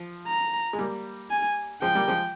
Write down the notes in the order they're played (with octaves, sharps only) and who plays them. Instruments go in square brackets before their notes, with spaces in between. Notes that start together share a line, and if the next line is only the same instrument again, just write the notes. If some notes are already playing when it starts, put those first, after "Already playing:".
Already playing: [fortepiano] F3
[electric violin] A#5
[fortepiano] G#3
G3 A#3
[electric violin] G#5
[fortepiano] F3 G#3 [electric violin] G5
[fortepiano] G3 A#3
F3 G#3